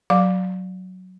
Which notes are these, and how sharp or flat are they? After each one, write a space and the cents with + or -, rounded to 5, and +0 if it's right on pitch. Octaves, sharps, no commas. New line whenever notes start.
F#3 +0 F5 +25